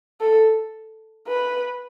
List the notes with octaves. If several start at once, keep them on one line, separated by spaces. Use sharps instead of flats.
A4
B4